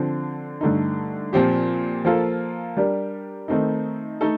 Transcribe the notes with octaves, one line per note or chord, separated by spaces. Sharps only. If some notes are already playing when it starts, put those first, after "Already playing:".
Already playing: D3 F3 C4
G2 D3 A3 D#4
A#2 F3 C4 G4
F3 A#3 F4 A4
G3 D4 G4 A#4
D#3 A3 C4 D#4
A3 D#4 A4